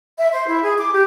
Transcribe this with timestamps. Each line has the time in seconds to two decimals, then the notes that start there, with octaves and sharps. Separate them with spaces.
0.19 E5
0.33 C5
0.48 E4
0.64 G#4
0.79 D6
0.92 G4